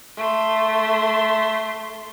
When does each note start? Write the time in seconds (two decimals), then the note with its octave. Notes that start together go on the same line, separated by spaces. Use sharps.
0.17 A3 C6